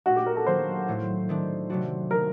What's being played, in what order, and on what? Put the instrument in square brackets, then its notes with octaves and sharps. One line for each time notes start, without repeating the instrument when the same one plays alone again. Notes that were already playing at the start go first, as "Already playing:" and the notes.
[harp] A#2 A3 D#4 [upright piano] F#4
[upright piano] G4
A#4
A4
[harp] D#3 F#3 A#3 [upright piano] C5
[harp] A2 F#3 A3
D#3 A3 D4
C3 F#3 A3 D4 F#4
[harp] D#3 F#3 A3 [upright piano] A#4